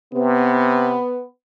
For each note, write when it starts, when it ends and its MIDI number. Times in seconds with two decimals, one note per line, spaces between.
0.13 0.98 48
0.13 1.22 59